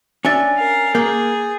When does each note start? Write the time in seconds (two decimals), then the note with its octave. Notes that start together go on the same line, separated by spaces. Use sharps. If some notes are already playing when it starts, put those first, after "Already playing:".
0.25 C#4 D4 E5 G#5 A6
0.57 A#4 F5
0.95 A#3 G#4 G6